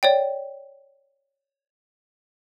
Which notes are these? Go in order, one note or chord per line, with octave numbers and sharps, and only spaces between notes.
C#5 D5 G5